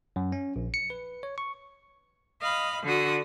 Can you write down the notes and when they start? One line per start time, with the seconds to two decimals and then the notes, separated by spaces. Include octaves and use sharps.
0.16 F#2
0.32 C#4
0.56 A#1
0.74 C#7
0.90 B4
1.23 C#5
1.38 C#6
2.42 D#5 F5 B5
2.84 D3 F#4 D#6